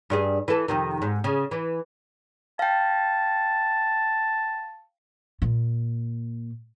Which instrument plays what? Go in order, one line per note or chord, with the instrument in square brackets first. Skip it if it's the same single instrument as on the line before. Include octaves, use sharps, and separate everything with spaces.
[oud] G2 G3 G#4
E3 A4
F2 C3 D#3
G#2
C#3
E3
[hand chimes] F5 G5 [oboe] A5
[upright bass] A#2